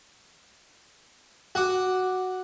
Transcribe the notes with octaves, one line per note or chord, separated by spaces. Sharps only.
F#4 F#5 D6